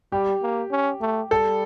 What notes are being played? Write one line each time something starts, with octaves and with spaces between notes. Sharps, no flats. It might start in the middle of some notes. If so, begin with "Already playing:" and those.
G3 G4
A#3
C#4
A3
G3 A4